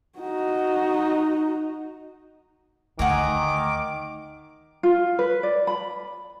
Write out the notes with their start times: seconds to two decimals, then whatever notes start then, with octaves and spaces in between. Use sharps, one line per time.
0.19 D#4 F#4
2.99 D2 D#3 A3 F#5 G#5 A#5 D6
4.83 F4
5.19 B4
5.43 D5
5.67 B5